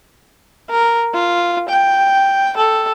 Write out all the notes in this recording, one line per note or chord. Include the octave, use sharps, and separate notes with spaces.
A#4
F4
G5
A4